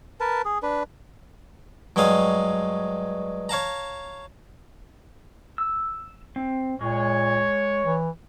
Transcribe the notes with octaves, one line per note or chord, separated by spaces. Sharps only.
A#4 B4 A5
G#4
D4 B4
G2 F#3 G#3 C#5 F5 D#6
C#5 F5 A5 A#5
E6
C4
A#2 G#3 C#5
E3